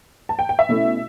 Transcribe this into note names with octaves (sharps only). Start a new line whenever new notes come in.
A5
G5
G5
E5
B2 A3 C#4 E4